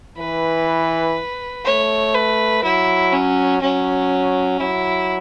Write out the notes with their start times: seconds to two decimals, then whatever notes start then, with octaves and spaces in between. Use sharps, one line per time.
0.18 E3 B4
1.65 A3 C#5
2.14 B4
2.64 F#3 E4
3.12 C#4
3.62 F#3 C#4
4.60 F#3 E4